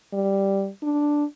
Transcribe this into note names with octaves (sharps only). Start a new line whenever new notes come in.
G3
D4